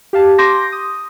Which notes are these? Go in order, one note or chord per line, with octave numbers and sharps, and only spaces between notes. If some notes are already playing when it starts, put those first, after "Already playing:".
G4 F5 A5
C6 D6 G6 A#6
D#6